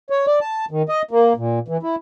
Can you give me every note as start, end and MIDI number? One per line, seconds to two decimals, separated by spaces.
0.10 0.26 73
0.27 0.39 74
0.41 0.65 81
0.71 0.82 51
0.89 1.02 75
1.11 1.33 58
1.37 1.59 46
1.68 1.77 52
1.83 1.96 64